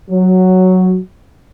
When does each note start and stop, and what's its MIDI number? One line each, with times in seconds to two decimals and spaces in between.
0.11 0.97 54